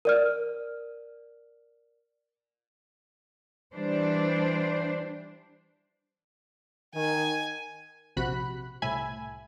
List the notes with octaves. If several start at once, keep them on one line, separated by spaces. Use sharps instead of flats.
A#4 D5 F6
E3 G3 D4 C5
D#3 G#5
A#1 C3 F#4 B5 F#6
C2 A2 E5 G#5 B5 G#6